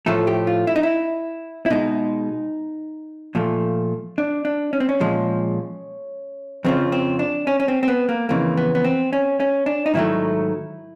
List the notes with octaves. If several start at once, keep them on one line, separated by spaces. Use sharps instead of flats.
A2 F3 A3 A4
G4
F4
E4
D#4
E4
E4
B2 G#3 D#4
A#2 F3 A3
D4
D4
C#4
C4
C#4
A#2 F3 G#3
F2 C#3 F3 C4
C4
D4
C#4
C#4
C4
C4
B3
A#3
F2 C#3 E3 A#3
B3
B3
C4
C#4
C#4
D4
D#4
G#2 D#3 F#3 A3 E4